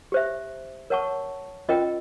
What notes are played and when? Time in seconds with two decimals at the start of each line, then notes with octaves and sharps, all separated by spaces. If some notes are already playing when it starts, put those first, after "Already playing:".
0.12 G4 C5 E5
0.90 A#4 C#5 F#5 A5 C#6
1.69 C#4 F4 A#4 D#5 G5